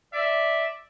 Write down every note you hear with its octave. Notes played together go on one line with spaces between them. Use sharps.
D5 E5